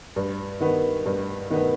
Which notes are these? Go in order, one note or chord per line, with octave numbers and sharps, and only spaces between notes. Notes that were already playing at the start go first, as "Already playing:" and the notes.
G2
D#3 B3
G2
D#3 B3